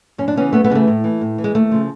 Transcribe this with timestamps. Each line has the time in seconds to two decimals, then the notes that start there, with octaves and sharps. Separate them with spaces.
0.18 F#2 C#4
0.28 D4
0.36 C#3 E3 B3 C#4
0.53 F#2 A3 B3
0.64 A3 B3
0.70 C#3 E3 G#3
0.75 A3
0.88 A2
1.04 E3
1.21 A2
1.38 E3
1.44 G#3
1.55 D#2 A3
1.72 C#3 F3